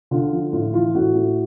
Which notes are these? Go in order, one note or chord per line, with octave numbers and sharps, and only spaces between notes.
D3 F4
F3
A2 F4
E3 F4
A2 F#4
A2